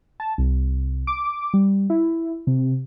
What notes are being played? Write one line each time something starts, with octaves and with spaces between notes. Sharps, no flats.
A5
C2
D6
G3
E4
C3